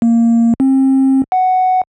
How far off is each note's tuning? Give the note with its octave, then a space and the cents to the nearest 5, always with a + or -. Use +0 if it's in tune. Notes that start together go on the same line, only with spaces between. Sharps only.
A#3 -10
C4 +35
F#5 +5